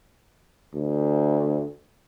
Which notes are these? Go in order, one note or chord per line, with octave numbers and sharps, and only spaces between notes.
D2